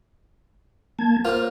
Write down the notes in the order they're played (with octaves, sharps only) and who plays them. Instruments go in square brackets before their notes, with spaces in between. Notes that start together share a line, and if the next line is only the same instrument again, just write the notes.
[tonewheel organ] A#3 A5 G#6
[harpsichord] A#3 F4 [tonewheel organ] C5 F6